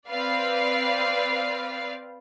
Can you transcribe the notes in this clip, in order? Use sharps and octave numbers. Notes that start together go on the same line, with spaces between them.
C4 B4 D5 F5